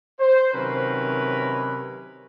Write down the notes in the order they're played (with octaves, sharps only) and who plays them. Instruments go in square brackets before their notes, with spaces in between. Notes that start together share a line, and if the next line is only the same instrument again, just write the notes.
[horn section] C5
C3 D#3 F#3 C#4 A#4 B4